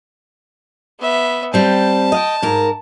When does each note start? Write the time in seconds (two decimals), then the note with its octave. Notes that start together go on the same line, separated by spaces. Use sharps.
1.00 B3 E5
1.54 G3 C4 A5
2.12 D#5 F5 G5
2.42 G#2 A#4